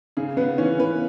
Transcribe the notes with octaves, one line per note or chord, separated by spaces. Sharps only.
C#3 G#4
C#3 B3 B4
E3 C#4 C#5
C#3 B3 B4